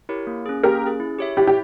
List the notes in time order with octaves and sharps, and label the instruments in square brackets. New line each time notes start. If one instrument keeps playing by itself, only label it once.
[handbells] E4 G4 A#4 C#5
A#3
C#4 G#4
[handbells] A#3 [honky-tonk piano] G4 A#4
[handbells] C#4 G#4
E4
G4 C#5 E5
[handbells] E4 [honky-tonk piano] G4
[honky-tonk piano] G4